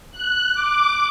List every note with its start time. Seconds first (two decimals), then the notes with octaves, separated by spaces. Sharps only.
0.11 F#6
0.54 D6